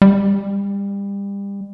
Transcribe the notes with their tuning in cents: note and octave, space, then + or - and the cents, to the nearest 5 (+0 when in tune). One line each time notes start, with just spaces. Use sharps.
G3 +30